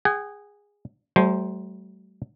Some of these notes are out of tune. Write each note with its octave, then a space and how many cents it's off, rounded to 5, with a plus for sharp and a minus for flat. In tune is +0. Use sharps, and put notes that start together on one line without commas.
G#4 -15 F#5 +40
F#3 +40 A3 -30 C5 +0